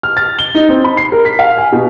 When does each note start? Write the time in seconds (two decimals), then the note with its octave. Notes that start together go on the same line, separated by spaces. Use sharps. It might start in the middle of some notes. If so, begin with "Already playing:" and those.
0.03 F6
0.17 A6
0.39 G7
0.55 D#4
0.69 C4
0.84 B5
0.97 C7
1.12 A#4
1.25 B6
1.39 F5
1.58 G#5
1.72 B2